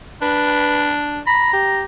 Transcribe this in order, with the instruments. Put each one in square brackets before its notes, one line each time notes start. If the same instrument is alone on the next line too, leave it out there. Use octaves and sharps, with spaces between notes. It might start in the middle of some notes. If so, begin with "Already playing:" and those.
[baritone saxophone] D4 [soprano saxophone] B4
[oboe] A#5 [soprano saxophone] B5
[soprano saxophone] G4